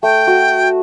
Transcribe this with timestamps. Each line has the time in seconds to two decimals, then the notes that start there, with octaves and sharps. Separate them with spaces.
0.03 A3 G5
0.27 F#4